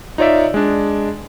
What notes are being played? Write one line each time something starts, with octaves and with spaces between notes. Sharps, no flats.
D#4 F4 C#5 D5 E5
G#3 D4